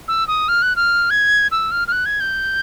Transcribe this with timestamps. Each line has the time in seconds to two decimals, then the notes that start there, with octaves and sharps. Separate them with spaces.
0.08 E6
0.28 D#6
0.48 F6
0.62 F#6
0.76 F6
1.10 G#6
1.52 E6
1.71 F6
1.88 F6
1.92 F#6
2.06 G#6
2.20 G6